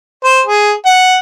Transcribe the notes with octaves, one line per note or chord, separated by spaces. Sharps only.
C5
G#4
F#5